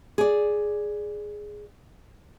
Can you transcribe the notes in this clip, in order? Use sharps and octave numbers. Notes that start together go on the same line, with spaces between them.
G#4 D5